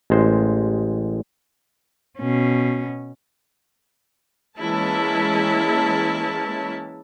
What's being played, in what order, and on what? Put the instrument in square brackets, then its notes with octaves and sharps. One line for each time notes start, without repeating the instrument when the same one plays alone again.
[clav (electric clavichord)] A1 G#3 C5
[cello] B2 C#4
[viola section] E3 G#3 A#3 C#4 E4 A5